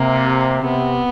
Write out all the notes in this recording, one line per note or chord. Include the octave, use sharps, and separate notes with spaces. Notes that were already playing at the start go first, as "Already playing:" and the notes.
Already playing: C3 A#3
C3 B3